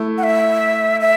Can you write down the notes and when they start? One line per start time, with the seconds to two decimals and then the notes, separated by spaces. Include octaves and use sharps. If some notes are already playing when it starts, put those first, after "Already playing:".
Already playing: A3 E4
0.18 F#5
0.23 E5
1.01 E5